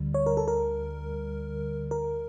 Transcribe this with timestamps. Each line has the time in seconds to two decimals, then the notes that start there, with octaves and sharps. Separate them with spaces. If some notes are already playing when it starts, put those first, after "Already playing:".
Already playing: D2 D3 G3
0.14 C#5
0.26 A#4
0.37 A4
0.48 A#4
1.91 A#4